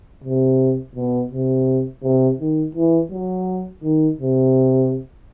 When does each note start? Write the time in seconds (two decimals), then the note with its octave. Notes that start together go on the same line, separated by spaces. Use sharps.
0.24 C3
0.95 B2
1.31 C3
2.03 C3
2.39 D#3
2.75 E3
3.11 F#3
3.83 D#3
4.19 C3